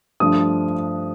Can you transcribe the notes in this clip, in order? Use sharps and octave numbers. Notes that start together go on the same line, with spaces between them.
G2 F3 A3 D4 D#6